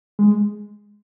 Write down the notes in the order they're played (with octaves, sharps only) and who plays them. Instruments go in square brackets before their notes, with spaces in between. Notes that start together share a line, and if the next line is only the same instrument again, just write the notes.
[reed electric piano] G#3